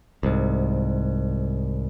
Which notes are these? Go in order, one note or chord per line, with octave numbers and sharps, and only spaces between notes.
C2 G#2